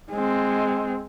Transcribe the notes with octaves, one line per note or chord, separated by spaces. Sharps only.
G#3 C4